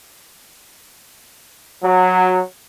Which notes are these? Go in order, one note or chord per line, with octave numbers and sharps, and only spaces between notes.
F#3